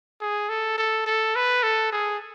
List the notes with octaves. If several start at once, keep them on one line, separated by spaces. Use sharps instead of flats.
G#4
A4
A4
A4
B4
A4
G#4